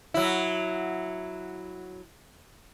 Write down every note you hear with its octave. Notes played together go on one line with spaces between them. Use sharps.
F#3 E4